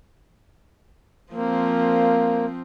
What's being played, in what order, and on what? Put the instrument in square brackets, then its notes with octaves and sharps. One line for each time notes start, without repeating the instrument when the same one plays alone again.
[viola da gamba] F3 C4 [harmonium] A#3